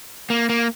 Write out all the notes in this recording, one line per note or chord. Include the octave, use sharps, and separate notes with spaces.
A#3
A#3